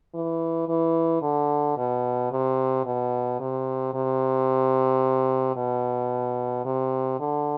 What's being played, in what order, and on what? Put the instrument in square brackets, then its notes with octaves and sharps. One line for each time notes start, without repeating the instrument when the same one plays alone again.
[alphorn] E3
E3
D3
B2
C3
B2
C3
C3
B2
C3
D3